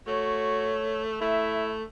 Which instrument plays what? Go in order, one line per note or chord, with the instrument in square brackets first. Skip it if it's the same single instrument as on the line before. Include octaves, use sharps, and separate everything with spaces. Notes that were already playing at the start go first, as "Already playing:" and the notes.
[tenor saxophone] A3 [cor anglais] F#4 [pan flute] C#5
[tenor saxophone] A3 [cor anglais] E4 [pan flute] E5